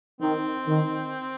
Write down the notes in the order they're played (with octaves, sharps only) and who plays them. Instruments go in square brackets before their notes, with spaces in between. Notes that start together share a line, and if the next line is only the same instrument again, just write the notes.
[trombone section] D#3 [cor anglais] C4
[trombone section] D#3